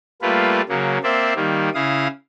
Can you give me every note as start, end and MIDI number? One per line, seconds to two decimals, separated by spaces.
0.22 0.61 55
0.22 0.61 57
0.22 0.61 58
0.22 0.61 65
0.22 0.61 71
0.69 0.98 49
0.69 0.98 54
0.69 0.98 58
1.03 1.33 58
1.03 1.33 60
1.03 1.33 72
1.03 1.33 74
1.03 1.33 76
1.36 1.69 51
1.36 1.69 55
1.36 1.69 58
1.74 2.07 49
1.74 2.07 64
1.74 2.07 77
1.74 2.07 87